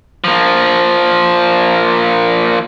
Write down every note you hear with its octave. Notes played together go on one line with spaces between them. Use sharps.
F3 A#3